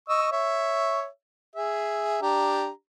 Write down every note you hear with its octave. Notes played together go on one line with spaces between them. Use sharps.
D#5 C#6 E6
C#5 E5
G#4 E5
D4 G4 A#5